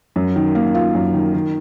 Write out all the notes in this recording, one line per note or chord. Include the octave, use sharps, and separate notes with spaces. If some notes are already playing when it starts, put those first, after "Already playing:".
F#2
D#3
A#3
F4
F#2
D#3
D#3